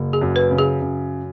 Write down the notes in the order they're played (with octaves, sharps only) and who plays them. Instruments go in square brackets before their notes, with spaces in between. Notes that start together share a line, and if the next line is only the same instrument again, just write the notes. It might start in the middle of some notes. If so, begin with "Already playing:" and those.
Already playing: [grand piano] F#1
[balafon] G#4
[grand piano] F#2
[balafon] B4
[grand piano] C#3
[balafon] G#4
[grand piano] F#2